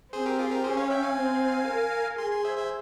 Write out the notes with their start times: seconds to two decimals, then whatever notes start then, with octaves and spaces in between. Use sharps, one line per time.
0.12 C4 G#4 C5
0.26 G4 A#4
0.39 F4 G#4
0.51 G4 A#4
0.64 C#4 G#4 C5
0.77 C#5 F5
0.90 E5 G5
1.03 F5 G#5
1.16 C4
1.67 A#4
2.18 G#4 G#5 C6
2.32 G#5 C6
2.44 C5 E5
2.57 C5 E5